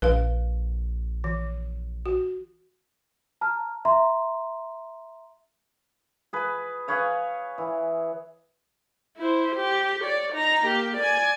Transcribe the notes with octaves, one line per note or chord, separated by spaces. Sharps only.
A#1 B4 F5
E3
F#4
A5 A#5 F6
E5 A#5 C6
G#4 B4
G#4 B4 C#5 F5
E3
E4 C5
G4
C#5 D5
D#4 A#5
A#3 G4
D5 G#5